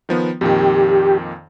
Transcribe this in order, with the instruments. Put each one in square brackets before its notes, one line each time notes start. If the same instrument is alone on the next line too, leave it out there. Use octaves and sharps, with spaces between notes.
[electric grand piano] D#3 F3 B3
[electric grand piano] F2 A#2 D#3 [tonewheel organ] G4